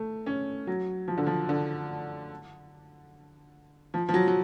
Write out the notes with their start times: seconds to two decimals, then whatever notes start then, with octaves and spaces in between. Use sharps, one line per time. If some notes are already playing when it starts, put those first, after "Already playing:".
Already playing: A3
0.26 C#4
0.67 F#3
1.08 F3
1.17 D3
1.27 F3
1.49 D3
3.94 F3
4.09 F3
4.14 F#3
4.28 F#3